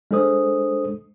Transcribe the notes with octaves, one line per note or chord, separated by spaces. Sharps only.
G#3 D4 A4 C5 D#6